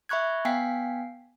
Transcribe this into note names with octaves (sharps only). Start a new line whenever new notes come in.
E5 B5 C#6 F#6 G#6
B3 F5 G5 G#5 B6 C7